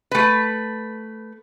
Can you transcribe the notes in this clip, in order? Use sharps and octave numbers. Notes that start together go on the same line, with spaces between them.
A3 B4